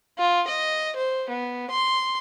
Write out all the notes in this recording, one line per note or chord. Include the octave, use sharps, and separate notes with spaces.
F4
D#5
C5
B3
C6